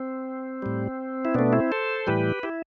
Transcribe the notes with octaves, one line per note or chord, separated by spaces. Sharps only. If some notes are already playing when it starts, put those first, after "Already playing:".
Already playing: C4
A2 G3
E4
B2 A3 B3 D4
C4 E4
A4 C5
A2 E3 G3 G4 B4
E4 G4